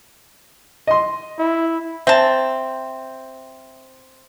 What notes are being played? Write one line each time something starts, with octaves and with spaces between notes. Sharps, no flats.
D#5 C6
E4
C4 E5 A5